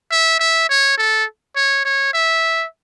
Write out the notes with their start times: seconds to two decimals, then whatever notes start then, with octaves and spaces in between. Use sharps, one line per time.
0.12 E5
0.39 E5
0.70 C#5
0.98 A4
1.56 C#5
1.85 C#5
2.14 E5